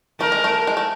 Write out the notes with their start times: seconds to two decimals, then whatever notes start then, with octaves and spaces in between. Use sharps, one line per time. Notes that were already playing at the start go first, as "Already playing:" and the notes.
0.20 A3 A#4
0.32 G#3
0.44 A3
0.67 G#3
0.77 A3